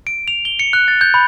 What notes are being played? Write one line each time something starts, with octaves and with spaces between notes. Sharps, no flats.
D7
F7
G7
C#7
F#6
A6
G6
B5